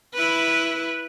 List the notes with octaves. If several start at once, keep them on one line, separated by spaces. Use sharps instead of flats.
E4 B4